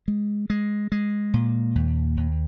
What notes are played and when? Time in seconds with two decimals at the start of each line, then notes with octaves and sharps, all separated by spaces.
0.08 G#3
0.50 G#3
0.92 G#3
1.34 A#2
1.75 D#2
2.17 D#2